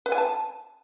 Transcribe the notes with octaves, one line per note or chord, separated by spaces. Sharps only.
B4
G#5
A5